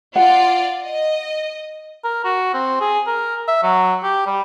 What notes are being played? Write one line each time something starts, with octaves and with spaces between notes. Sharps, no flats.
F4 D5 F5 F#5
D#5
A#4
F#4
C4
G#4
A#4
E5
F#3
G4
G3